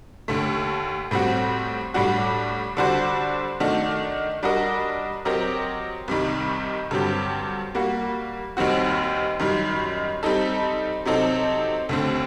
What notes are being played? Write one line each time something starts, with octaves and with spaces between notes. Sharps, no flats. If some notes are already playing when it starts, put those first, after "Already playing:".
D#2 D3 A3
A2 G3 C4 F#4
A2 G3 D4 F#4
D3 G3 D4 F#4 C5
D#3 A3 D4 F#4
G3 D4 F#4 A#4 D#5
F#3 C4 G4 A#4 D#5
C2 C3 D#3 G3
G2 D3 F#3 C4 G4
G3 A#3 F#4
D#2 D#3 G3 C4 F#4
F#2 D#3 G3
G3 C4 D#4 A4
C3 F#3 C4 D#4 A4
D#2 D3 A3 C4